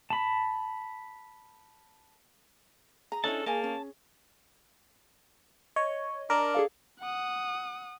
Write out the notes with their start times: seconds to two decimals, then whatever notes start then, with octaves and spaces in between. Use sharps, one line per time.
0.10 A5 B5
3.12 G#4 A#5 A#6
3.24 C#4 D4 E4 A4 C#5 D#5 A5
3.46 A#3 G#4 D#5 G#5 A5
3.64 C#4
5.76 C#5 D#5
6.30 D4 A#4
6.54 G#4 A4 F5
7.00 F#5 D#6